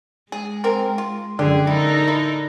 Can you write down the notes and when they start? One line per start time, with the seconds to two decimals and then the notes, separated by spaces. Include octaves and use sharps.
0.32 G#3 G#4
0.64 C4 A#4
0.98 F4
1.39 F#2 D3 G4 G#4
1.67 D#4 E4 A4 A#4
2.08 E4